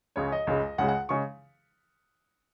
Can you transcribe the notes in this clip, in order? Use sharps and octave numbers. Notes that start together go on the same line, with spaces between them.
C#2 C#3 G#3 C#5
D#5
C#2 C#3 G#3
C#2 C#3 G#3 F#5
F#5
C#3 G#3 C#6